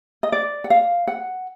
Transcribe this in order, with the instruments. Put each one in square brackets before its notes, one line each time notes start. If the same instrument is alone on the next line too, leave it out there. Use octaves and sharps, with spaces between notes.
[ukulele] D#5
D5
F#5
F5
F#5